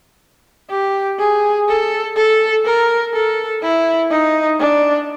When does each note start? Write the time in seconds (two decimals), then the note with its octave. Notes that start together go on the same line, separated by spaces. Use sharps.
0.70 G4
1.19 G#4
1.69 A4
2.16 A4
2.65 A#4
3.14 A4
3.62 E4
4.10 D#4
4.60 D4